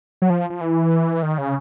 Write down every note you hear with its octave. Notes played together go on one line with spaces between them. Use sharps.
F#3
F3
F3
E3
D#3
C#3